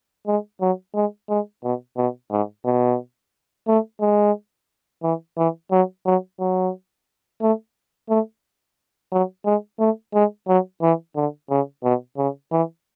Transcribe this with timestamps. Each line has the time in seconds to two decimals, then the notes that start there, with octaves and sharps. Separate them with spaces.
0.27 G#3
0.61 F#3
0.95 G#3
1.29 G#3
1.63 B2
1.97 B2
2.31 G#2
2.65 B2
3.68 A3
4.01 G#3
5.03 E3
5.37 E3
5.71 F#3
6.06 F#3
6.40 F#3
7.41 A3
8.09 A3
9.12 F#3
9.45 G#3
9.79 A3
10.14 G#3
10.48 F#3
10.82 E3
11.16 D3
11.50 C#3
11.83 B2
12.18 C#3
12.52 E3